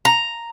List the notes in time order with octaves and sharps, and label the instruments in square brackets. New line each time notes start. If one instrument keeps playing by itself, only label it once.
[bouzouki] A#5